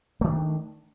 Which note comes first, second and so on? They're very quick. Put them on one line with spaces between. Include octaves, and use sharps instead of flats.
A3 D#3 D4